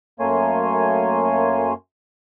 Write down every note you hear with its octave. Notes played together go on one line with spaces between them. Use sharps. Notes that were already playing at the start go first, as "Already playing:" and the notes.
F#2 A3 A#3 C#5 G#5 C6